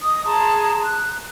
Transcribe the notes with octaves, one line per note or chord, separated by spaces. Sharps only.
D#5 D#6
G#4 A5 A#5 C6
F#6